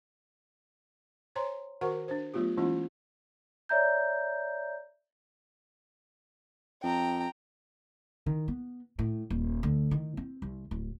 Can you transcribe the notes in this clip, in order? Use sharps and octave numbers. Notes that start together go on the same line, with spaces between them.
C5 C#5 G#5 A#5 C6
D#3 F#4 A#4 C5 F#5 C#6
D4 C5
F#3 A3 B3 F4 G4
E3 G#3 A#3 C#4 E4 F4
C#5 D5 E5 A#5 G6
F2 G5 A#5
D#3
B3
A2
D#1
D2
D#3
C4
C2
D1